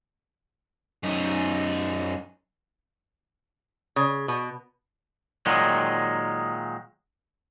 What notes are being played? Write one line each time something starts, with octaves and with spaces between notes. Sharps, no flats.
F#2 D#4
C#3
B2
A#2 D#3 F#3 G#3